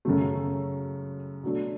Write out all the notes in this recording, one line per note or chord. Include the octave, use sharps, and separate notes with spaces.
F#2 C#3 F#3 A3
B2 F#3 A3 D4